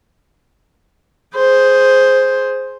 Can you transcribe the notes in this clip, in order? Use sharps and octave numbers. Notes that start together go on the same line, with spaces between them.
G#4 C5